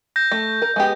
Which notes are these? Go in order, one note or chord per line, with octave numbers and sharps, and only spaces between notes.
G6 A#6
A3
A#4
G#3 B3 G4